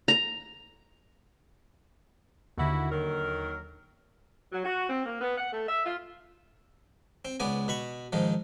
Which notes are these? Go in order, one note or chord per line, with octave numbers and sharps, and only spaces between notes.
A#5
D#2 D3 E4 F#4
D#3 F#3 A#4
F#3
F#4
C4
A#3
B3
F#5
A3
E5
F4
C4
C#2 B3 D5 G#5
B2 B5 C#6
G#2 D#3 F3